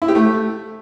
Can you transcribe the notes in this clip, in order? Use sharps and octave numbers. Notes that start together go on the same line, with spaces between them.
E4
G4
A3